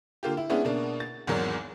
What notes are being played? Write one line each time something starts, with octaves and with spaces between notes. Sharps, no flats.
D3 A#3 F4 G4
E4
G#3 B3 C#4 D4 E4 G#4
B2 A#3 D4
A6
G#1 E2 G#2 F#3 A#4 D5